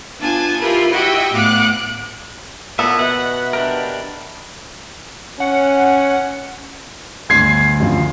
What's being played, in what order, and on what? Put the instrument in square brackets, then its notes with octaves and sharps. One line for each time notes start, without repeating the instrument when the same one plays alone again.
[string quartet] B3 D4 F4 G#5 A5
E4 F4 G4 A#4 B4
E4 F#4 G4 D#5 E5 G5
A2 B3 F5 F#5 D6 F#6
[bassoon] A#2 [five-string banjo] B3 [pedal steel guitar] E4 A4 E5 [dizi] F#5
[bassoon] B2 [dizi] E5 [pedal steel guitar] F#5
[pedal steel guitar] D4 G4 A#4
[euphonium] C#4 [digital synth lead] F#5
[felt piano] G1 C6 [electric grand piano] D2 G#6 C7
[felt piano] F#2 D3 F3